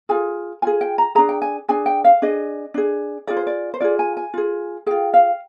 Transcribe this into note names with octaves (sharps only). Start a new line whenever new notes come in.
F4 G#4 G#5
F4 G#4 G#5
G5
A#5
D4 G#4 A#5
G5
G#5
D4 G#4 G#5
G5
F5
D4 G#4 D#5
D4 G#4
F4 G#4 D5
C5
D5
C5
F4 G#4 D5
G#5
G#5
F4 G#4
F4 G#4 G5
F5